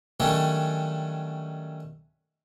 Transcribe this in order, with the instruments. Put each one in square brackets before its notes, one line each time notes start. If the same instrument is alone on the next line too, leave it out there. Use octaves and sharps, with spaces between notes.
[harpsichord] D#3 F#3 G3 A3 C#4 D4